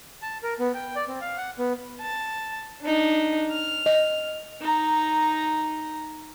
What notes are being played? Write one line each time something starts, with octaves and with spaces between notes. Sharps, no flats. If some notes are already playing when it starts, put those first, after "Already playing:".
A5
A#4
B3
G5
D5
C4
F5
F#5
B3
A5
D4 D#4
F6
D#5
D#4 A#5